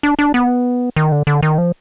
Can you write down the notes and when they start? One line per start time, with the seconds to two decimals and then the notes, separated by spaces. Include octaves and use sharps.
0.03 D4
0.19 D4
0.34 B3
0.96 D#3
1.12 D3
1.27 D3
1.43 D#3
1.58 F3